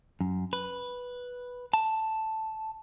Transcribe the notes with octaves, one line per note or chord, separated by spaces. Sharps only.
F#2
B4
A5